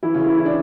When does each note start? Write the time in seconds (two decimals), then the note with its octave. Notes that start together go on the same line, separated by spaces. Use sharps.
0.03 E3 E4
0.15 C#3 C#4
0.26 E3 E4
0.38 E4
0.46 D4